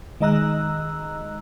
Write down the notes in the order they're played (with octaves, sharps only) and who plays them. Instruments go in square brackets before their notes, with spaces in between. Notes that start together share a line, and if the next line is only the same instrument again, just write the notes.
[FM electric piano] D#3 G#3 D#5 A#5 E6 F#6